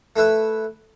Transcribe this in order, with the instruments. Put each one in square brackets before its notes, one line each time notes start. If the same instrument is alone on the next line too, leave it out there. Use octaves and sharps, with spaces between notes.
[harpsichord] A3 E4 B4 E5